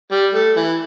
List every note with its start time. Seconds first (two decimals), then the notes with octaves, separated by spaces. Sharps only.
0.11 G3
0.34 A3
0.57 E3